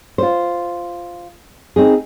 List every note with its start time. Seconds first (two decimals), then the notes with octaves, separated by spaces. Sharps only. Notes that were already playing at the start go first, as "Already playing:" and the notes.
0.18 F4 C5
1.76 C4 D#4 G#4